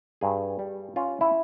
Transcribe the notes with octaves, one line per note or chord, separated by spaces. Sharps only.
G2 G#4
G3
C#4 F4
E4